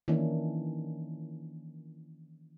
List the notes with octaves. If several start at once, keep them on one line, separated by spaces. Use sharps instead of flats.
D#3 E3 A#3 C#4 D4 E4